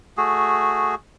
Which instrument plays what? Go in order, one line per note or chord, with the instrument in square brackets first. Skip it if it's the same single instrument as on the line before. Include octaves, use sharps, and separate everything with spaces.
[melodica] A3 F#4 G#4